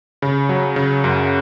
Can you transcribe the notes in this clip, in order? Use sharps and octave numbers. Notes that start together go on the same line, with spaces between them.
C#3
F#3
C#3
F#2